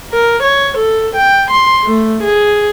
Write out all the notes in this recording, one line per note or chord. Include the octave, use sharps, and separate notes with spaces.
A#4
C#5
A4
G5
C6
A3
G#4